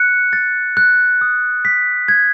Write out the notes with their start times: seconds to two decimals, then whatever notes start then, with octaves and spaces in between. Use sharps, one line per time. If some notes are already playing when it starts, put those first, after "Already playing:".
Already playing: F#6 C#7
0.33 A6
0.77 F#6
1.21 D#6
1.65 B6
2.08 G#6